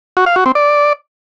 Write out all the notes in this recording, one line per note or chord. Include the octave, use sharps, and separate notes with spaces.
F#4
F5
F#4
C4
D5